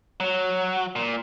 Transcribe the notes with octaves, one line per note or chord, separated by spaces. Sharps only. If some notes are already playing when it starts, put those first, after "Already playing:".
F#3
A#2